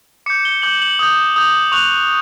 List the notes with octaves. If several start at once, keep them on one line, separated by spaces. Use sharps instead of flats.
D6 G6 C#7
G7
D6 G6 F#7
F#7
D#6 G6
D#6 G6
C#6 F#6 F7